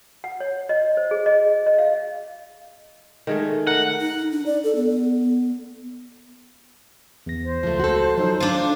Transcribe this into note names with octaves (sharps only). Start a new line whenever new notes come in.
F#5
C#5
D#5
C5
G#4
D#5
D#5
F5
D#3 G#3 A3
A#4 F#5
D#4
D4
D5
A4
B3
B3
E2 A#6
C5
C#2 F3 A3
F#4 A4
F3 F#3 D#4 A4
D4 F4